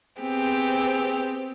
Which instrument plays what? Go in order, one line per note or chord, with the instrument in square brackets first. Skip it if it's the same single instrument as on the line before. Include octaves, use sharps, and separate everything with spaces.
[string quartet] B3 C4 G4 G#4